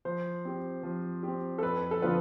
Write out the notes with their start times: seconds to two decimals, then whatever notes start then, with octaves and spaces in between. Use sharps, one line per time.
0.05 F3 C5
0.45 C4 G4
0.83 F3
1.23 C4 G4
1.58 A4
1.63 F2 B4
1.91 A4
2.02 D3 F3 B3 F4 B4